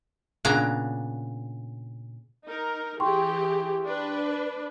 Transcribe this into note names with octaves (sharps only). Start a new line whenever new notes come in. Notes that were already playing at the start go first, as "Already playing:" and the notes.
A#2 C#3 B3 D4 A#5
D#4 A#4
E3 G4 G#4 G5 C6 C#6
D4 B4